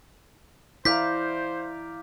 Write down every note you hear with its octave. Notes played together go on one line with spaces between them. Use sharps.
E4 C5 D5 F5 A#5 G6 B6